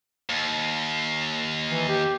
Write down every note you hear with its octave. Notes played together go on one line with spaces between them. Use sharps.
D#2
E3
G4